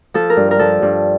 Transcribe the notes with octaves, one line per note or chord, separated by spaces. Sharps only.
F3 A4
A#4
G2
A#4
F3 A4
G2